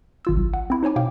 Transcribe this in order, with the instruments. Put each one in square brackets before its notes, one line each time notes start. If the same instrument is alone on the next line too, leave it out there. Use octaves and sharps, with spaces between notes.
[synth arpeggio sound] G#1 F4 E6
B1
F#5
C4 E4
D#4 C5 C#5 G#5 D6
B2 F5 G5 D6